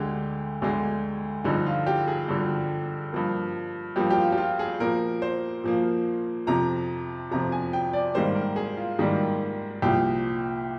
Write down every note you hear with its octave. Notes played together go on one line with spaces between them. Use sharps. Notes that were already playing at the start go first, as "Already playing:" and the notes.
Already playing: D2 D3 G#3 G4
D2 D3 G#3
G2 D3 F3 D#4
F4
G4
G#4
G2 D3 F3
G2 F3 A#3
G2 F3 A#3 G4
G4
F4
G4
F4
G#4
A#2 F3 A#3 A#4
C5
A#2 F3 A#3
F2 C3 F3 A#5
F2 C3 F3 A#5
G#5
G5
D5
G#2 D#3 G3 A#3 C5
A#4
G#4
F4
G#2 D#3 G3 A#3
C2 A#2 F3 G4